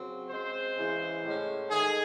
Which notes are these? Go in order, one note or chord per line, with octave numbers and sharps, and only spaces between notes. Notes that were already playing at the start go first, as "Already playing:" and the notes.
Already playing: C#3 F#3 C4
C#3 G#3 C4 C5
C#3 E3 G#3
A2 G#3 C#4
G#2 D#3 A3 G#4